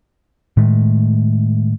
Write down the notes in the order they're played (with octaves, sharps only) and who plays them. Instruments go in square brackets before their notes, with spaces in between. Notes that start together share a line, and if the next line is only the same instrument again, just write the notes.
[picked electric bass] A2 D#3 G#3 A3